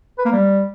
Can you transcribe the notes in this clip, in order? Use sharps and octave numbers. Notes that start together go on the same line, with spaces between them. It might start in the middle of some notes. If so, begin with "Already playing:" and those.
B4
A#3
G3